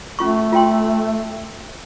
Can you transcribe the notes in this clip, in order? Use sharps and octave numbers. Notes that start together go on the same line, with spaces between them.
A3 C#4 F4 C#6
F4 G5 C6